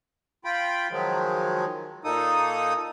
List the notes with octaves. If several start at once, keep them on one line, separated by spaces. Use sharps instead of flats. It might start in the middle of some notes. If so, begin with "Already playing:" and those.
F4 G5 B5
D#3 F3 F#3 G#3
A#2 A#3 D#4 A4 D#6